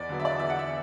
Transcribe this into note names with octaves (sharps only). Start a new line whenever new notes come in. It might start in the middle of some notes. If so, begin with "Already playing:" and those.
Already playing: E2 D5
D3 F#3 B3
E5
D5
E2 E5
F#5
E5